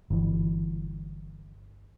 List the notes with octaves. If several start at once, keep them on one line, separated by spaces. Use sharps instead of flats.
G1 E3